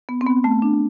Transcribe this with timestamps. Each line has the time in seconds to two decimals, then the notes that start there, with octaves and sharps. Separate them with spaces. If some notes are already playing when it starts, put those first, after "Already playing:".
0.09 B3
0.21 C4
0.26 B3
0.44 A3
0.62 D4